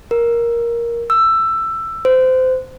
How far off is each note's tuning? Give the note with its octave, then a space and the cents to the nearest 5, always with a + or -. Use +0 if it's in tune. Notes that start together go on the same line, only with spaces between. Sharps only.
A#4 +10
E6 +10
C5 -25